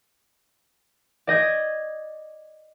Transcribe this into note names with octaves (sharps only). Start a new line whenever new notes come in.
D5 D#5 G6 G#6